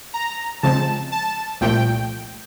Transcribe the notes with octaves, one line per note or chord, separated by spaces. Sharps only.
A#5
C#3 F3 G#3 C4 A5
A5
C2 A#2 F3 A3 G5